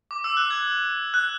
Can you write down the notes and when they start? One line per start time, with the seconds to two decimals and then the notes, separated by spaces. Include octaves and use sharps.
0.11 D6
0.24 E6
0.37 F#6
0.50 G#6
1.14 F#6